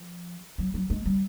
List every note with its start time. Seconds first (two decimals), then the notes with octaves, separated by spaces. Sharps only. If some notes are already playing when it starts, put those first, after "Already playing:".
Already playing: F3
0.58 F#3
0.74 F#3
0.90 G#3
1.06 G3